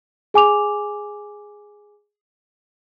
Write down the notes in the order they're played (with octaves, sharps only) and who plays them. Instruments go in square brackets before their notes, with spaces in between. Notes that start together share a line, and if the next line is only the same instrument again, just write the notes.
[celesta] G#4 G#5 D6 F7